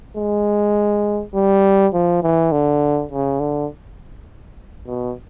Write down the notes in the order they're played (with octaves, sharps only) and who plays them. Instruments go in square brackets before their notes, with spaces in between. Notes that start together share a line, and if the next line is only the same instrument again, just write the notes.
[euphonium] G#3
G3
F3
E3
D3
C#3
D3
B2